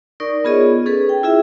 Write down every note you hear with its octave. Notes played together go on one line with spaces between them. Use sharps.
D#4 A#4 D5 C#6
B3 F4 G#4 C#5 D#5
D#4
C#4 G#4 A4 B4
G5
E4 F4 G#4 E5